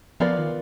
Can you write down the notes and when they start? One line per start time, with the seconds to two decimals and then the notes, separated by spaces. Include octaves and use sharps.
0.20 F3 B3 F4 A#4 D5
0.38 D#3